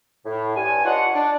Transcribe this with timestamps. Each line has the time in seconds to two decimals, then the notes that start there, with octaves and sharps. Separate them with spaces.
0.25 A2
0.55 G2 G#5
0.85 D4 F4 C#5 D#5 F#5
1.12 D4